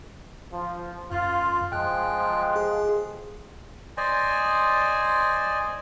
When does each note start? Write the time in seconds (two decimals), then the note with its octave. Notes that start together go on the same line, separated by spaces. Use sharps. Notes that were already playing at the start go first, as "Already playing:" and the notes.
0.53 F3
1.11 F#2 F4
1.72 F3 G#3 G5 F#6
2.56 G#4
3.97 C5 D5 D#5 G#5